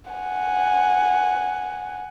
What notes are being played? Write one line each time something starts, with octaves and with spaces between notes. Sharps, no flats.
F#5 G#5